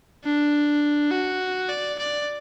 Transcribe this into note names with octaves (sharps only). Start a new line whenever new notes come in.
D4
F#4
D5
D5